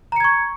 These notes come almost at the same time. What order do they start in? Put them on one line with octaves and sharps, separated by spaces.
A#5 C#7 G#6 C#6